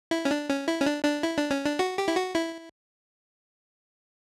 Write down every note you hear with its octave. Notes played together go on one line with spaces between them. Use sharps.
E4
C#4
D4
C#4
E4
C#4
D4
D4
E4
D4
C#4
D4
F#4
G4
E4
F#4
E4